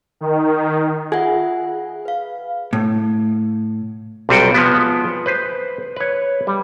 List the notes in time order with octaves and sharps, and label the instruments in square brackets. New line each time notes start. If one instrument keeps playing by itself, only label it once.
[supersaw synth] D#3
[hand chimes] F4 E5 F#5 [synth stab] G#4
[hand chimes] B4 F5
[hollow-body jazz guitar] A2
[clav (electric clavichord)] B1 C3 G3 F4 F#4 G5
F3 G#3 B3
B4 C5
B4 C#5
G3